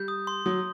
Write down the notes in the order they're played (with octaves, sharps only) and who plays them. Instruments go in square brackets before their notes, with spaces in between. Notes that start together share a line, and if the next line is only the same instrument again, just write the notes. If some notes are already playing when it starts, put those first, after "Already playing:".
Already playing: [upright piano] G3 [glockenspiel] G6
[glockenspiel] D#6
C6
[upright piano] F#3 [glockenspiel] D#6